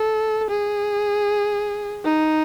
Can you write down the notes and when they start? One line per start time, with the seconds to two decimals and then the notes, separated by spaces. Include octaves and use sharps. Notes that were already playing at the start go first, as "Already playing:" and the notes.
Already playing: A4
0.50 G#4
2.05 D#4